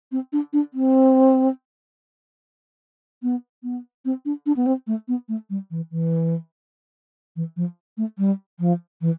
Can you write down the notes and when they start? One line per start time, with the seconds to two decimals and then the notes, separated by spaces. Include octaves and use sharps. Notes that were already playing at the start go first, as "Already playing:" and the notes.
0.12 C4
0.33 D4
0.53 D4
0.74 C4
3.23 B3
3.63 B3
4.05 C4
4.25 D4
4.46 D4
4.57 B3
4.66 C4
4.87 A3
5.08 B3
5.29 A3
5.50 G3
5.71 E3
5.91 E3
7.36 E3
7.57 F3
7.97 A3
8.18 G3
8.60 F3
9.01 E3